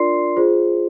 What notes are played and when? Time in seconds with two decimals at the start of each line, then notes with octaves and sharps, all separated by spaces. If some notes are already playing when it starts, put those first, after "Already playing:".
Already playing: D4 F4 A#4 D5 C6 C7
0.37 F4 G#4 C5